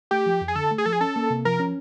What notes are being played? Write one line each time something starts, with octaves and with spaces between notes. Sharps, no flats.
A3 G4
F3
F2
G#4
D3 A4
A3
G#4
F3 A4
G#4
C#4 A4
A#3
C3
F3 A#4
C#4